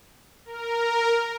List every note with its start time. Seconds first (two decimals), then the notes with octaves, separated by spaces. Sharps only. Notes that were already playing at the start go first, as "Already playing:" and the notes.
0.45 A#4